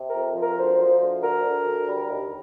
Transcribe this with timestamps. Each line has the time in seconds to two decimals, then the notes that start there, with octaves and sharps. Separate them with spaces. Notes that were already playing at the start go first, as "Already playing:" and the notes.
Already playing: C3
0.08 F2 A#4
0.35 F3
0.41 A#4
0.57 D2 C5
0.78 F3
1.00 D2
1.23 D3 A#4
1.44 D2
1.66 D3
1.87 G3
2.10 D#2